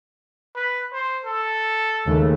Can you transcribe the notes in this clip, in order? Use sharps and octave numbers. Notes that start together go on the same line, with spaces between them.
B4
C5
A4
D#2 C#3 A3